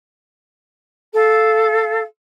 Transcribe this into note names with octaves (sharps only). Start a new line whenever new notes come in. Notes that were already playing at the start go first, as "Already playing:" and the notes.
A4 F5